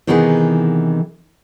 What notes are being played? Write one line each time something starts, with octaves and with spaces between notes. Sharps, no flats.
C3 D#3 E3 B3 D#4 G#4